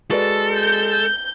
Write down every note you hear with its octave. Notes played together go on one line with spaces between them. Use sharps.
G#3 F#4 A4 B4 D5
G6